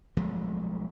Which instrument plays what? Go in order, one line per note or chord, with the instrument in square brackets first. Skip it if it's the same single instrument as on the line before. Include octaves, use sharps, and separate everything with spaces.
[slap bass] B1 F3 G#3 A3